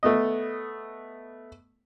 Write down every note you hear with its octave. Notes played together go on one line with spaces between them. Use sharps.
A3 B3 D#5